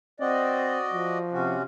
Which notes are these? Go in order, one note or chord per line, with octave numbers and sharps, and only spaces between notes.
C4 F#4 D5 D#5
F3
C3 C#4 F#4